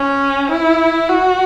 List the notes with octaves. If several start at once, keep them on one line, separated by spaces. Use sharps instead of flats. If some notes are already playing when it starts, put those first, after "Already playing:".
Already playing: C#4
E4
F#4